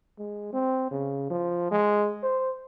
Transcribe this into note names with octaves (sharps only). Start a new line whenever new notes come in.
G#3
C4
C#3
F3
G#3
C5